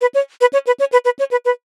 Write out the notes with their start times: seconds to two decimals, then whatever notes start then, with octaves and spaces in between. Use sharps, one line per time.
0.01 B4
0.14 C#5
0.41 B4
0.53 C#5
0.67 B4
0.80 C#5
0.92 B4
1.05 B4
1.19 C#5
1.31 B4
1.45 B4